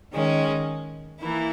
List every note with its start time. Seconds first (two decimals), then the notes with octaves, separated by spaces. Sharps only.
0.12 D#3 G#3 C#4
1.21 E3 A#3 E4